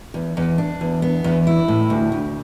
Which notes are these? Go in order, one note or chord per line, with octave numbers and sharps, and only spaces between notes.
E2
E2
D4
E2
B3
E2
E4
A2
D2
D2